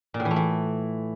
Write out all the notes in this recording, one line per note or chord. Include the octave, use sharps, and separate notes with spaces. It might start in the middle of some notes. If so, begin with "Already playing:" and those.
A#2
A2
E3
A3
E3